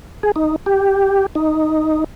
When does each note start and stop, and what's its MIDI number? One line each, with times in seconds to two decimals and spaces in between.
0.23 0.32 68
0.36 0.56 63
0.66 1.26 67
1.35 2.04 63